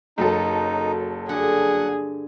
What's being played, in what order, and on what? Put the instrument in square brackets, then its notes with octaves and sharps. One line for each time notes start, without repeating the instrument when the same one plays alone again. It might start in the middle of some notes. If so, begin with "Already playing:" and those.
[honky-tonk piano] F#1 F#3 A4 [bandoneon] D#4
[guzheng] G2 D3 [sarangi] G#4 [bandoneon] F#5